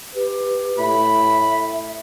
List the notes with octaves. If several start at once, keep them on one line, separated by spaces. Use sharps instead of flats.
G4 B4
A2 E5 B5